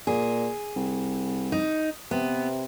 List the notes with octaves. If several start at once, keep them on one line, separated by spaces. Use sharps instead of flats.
A#2 G#4
C2
D#4
C3 B3